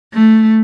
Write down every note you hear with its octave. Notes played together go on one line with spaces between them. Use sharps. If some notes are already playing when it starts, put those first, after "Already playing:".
A3